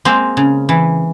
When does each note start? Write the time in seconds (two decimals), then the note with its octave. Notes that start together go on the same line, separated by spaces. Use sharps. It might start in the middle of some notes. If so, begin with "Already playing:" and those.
0.05 G#3 A#3 C4
0.37 C#3
0.69 E3